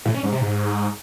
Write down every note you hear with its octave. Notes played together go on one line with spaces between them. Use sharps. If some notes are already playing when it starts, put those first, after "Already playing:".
A2
C#4
G#2
C3
G#2